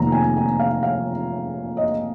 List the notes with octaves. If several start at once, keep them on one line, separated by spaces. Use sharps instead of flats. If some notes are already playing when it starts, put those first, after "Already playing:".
Already playing: F1 F2 D#3 A#3 A#5
G#5
G#5
F5
F5
D#5